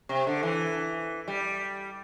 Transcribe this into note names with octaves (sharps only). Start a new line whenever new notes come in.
C3
D3
E3
G3